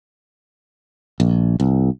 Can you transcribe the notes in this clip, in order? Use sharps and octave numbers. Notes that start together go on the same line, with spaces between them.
A#1
C2